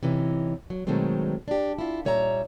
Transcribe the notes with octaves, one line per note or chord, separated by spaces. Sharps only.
C3 E3 C#4 D#4
F#3
B2 D#3 F#3 G#3 A3 C4
D4 G4
E4 F4
A#2 G3 C#5 E5 G#5 A#5